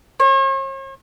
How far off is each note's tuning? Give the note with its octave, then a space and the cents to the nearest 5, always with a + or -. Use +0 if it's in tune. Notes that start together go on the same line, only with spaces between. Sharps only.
C#5 -45